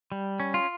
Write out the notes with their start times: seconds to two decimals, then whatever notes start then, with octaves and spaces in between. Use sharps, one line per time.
0.12 G3
0.40 C#4
0.54 F4